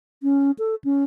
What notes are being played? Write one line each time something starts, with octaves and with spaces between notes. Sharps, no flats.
C#4
A4
C#4